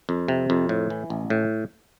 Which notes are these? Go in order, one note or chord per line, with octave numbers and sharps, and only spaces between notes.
F2
C3
F2
A2
E3
A1
A2